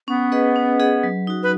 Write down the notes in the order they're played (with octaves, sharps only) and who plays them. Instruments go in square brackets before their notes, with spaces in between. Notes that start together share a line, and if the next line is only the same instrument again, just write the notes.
[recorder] B3 [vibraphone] C#4
[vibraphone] G#4 B4 D#5 F#5
C#4
G#4 B4 D#5 F#5
F#3
D#4 F#4
[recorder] B4